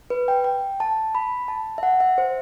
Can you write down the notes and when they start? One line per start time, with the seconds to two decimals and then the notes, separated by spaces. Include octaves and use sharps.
0.10 B4
0.28 G5
0.44 G5
0.80 A5
1.15 B5
1.48 A5
1.78 E5
1.83 F#5
2.00 E5
2.18 C5